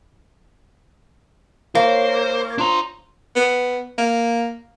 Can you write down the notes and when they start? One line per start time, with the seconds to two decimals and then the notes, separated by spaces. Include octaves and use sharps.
1.75 A#3 E4 C5 C#5
2.58 D4 F4 C5 A#5
3.35 B3
3.98 A#3